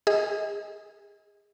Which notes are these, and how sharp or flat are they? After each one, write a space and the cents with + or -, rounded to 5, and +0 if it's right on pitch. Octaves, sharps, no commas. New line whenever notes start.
G#4 -30 D#5 +25